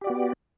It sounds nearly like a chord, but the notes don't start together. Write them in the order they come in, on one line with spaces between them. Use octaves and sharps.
G4 D5 F#4 B3